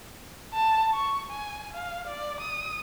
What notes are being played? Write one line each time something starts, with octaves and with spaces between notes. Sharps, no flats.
A5
C#6
G#5
F5
D5
D#6